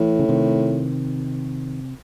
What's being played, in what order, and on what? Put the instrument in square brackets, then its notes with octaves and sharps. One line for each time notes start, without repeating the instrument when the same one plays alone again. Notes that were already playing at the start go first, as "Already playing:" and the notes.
Already playing: [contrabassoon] A2 [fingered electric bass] E3
[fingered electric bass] C#3
C3 D#3